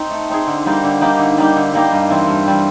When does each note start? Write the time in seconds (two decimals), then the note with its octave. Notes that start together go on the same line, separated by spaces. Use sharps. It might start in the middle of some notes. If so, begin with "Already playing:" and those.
Already playing: C4 D#4
0.11 A3
0.30 C4 D#4 G#4
0.47 D3
0.66 G3 A#3 D#4 G4
0.83 D3
1.01 G3 A#3 D#4 G4
1.19 D3
1.37 G3 A#3 D#4 G4
1.56 D3
1.73 G3 A#3 D#4 G4
1.92 G2
2.10 E3 G3 C4
2.28 G2
2.46 E3 G3 C4